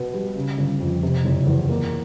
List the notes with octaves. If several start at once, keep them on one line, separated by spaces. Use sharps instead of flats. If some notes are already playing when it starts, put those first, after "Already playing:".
Already playing: B2 B3
G3
C#3
G1
F2
C3
F#1
E2
A#3